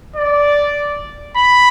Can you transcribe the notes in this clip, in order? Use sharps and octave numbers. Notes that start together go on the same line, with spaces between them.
D5
B5